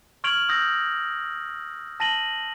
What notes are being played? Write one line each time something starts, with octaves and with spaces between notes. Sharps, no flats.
C#6 F6 G#6 D7 F7 F#7
D#6 E6 G6 A#6
A5 A#6 D#7 F#7 G7